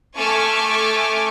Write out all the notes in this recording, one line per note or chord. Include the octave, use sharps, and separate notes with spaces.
A3 A4 G#5 C#6 D6 F6